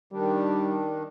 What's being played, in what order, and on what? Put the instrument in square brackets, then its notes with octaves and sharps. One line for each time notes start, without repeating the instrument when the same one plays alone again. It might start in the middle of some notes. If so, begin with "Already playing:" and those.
[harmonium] D#3 D4 [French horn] G3